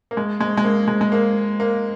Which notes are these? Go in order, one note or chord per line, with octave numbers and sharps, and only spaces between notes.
A#3
G#3
G#3
G#3
A#3
G#3
G#3
A#3
A#3